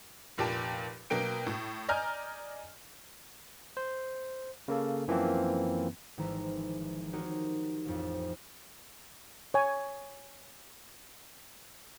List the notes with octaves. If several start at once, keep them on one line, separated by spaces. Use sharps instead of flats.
F1 A#2 G4 A5
B2 F#3 A#3 G5 D7
A2
D5 D#5 G#5 A#5 F6 G6
C5
C#3 A#3 A4
F#2 E3 F3 A#3 C4
G#1 E3 F3 E4 A#5
C4 D#4 F#4 G4 A#4 C#5
A1 F2
C#5 G#5